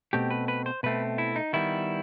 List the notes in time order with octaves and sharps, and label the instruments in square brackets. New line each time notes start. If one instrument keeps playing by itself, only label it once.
[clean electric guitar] B2 A3 C4 G4
B4
B4
C5
B2 A3 C4 B4
E4
D#4
D#3 G3 B3 E4